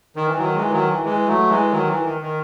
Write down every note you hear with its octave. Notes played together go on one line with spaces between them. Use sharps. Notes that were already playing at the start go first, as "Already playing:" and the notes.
D#3
E3
D#3 F#3
E3 G#3
D#3 F#3
E3
E3 G#3
F#3 A3
E3 G#3
D#3 F#3
E3
D#3
D#3